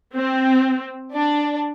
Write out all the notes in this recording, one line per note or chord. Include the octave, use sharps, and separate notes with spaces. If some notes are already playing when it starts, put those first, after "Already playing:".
C4
D4